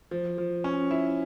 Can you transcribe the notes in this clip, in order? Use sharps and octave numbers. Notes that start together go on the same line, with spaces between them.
F3
F3
C#4
E4